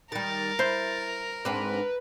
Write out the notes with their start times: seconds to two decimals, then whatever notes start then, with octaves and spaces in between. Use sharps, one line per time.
0.12 D#3 G3 A#4 A6
0.59 E4 C5
1.45 G#2 C4 D4 B4